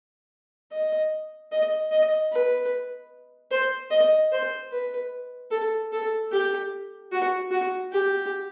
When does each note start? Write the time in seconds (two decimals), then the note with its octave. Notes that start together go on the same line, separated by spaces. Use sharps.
0.72 D#5
1.52 D#5
1.92 D#5
2.32 B4
3.51 C5
3.91 D#5
4.32 C5
4.72 B4
5.51 A4
5.92 A4
6.32 G4
7.12 F#4
7.51 F#4
7.92 G4